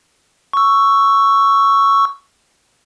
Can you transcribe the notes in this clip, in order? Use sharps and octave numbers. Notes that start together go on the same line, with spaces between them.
C#6 E6